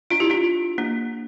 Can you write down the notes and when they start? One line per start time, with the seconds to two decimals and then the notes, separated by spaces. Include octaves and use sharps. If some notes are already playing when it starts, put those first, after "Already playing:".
0.11 D4 F4
0.20 E4 G4
0.30 D4 F4
0.78 A#3 D4